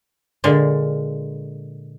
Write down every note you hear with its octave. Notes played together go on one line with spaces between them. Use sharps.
A#2 D3 G#3